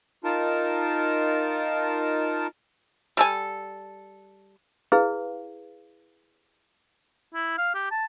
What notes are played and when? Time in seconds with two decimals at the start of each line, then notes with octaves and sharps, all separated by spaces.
0.24 D#4 F4 A#4 A5
3.17 G3 A4 G#5
4.92 E4 G#4 B4 F5
7.34 E4
7.58 F5
7.74 G4
7.91 A5